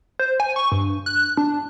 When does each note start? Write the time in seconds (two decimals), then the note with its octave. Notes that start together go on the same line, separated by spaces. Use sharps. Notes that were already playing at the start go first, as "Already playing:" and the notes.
0.19 C5
0.40 G#5
0.56 C#6
0.72 G2
1.06 F#6
1.37 D4